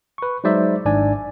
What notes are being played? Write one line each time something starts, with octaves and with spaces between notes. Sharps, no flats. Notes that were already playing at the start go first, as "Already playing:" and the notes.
B4 C#6
F#3 G#3 D#4 C5 D5 E5
G#1 G#2 D4 D5 G#5